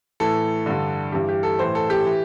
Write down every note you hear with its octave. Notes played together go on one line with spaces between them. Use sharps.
A2 E3 A4
G2 D3
G2 E3 G4
G4
A4
A2 E3 C5
A4
G4
E3